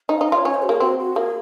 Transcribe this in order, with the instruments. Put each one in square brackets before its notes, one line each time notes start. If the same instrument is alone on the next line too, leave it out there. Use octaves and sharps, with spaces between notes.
[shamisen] D#4 [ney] D#5
[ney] F5
[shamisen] D#4
[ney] D#5
[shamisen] F4 [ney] C#5
[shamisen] C#4 [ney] C#5
[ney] C5
F#4
[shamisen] A#3 [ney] G#4
[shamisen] C4 [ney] F#4
[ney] F#4
[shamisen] A#3 [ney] G#4